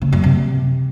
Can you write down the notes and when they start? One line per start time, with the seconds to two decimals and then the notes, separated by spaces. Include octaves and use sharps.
0.02 C#3
0.13 F#2
0.24 C3